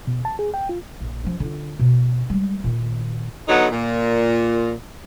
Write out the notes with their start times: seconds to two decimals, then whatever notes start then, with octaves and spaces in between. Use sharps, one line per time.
0.07 B2
0.25 A5
0.39 G#4
0.54 G5
0.69 F4
1.00 A#1
1.24 F3 C#4
1.40 D3 F4
1.79 B2
2.30 G3 G#3
2.64 A#2 D#3
3.48 D3 F#3 B3 D#4
3.71 A#2